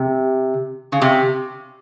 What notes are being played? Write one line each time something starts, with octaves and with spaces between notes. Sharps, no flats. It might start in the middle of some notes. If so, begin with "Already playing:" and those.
Already playing: C3
C#3
C3